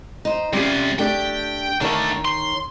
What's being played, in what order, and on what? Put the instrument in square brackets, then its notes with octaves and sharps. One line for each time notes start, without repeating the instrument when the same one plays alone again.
[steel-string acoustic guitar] D#4 C5
[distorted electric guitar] C3 F4 [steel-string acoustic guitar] G3 C#4 G4
[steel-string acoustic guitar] A3 D4 G4 [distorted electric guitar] G5
[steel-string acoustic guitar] D#3 C#5 [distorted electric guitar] A3 D4
[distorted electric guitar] C6